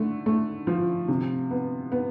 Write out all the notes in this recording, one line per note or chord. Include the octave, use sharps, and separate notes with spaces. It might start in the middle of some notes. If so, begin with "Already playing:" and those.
Already playing: D3 A3
A3
F3
C3
B3
B3